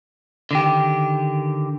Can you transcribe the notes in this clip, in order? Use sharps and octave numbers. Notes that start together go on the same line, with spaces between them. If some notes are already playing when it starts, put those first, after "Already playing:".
D3 D#3 G4